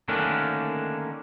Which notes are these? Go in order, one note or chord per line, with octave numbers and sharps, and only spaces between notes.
D3 D#3 A3 A#3 C#4 D4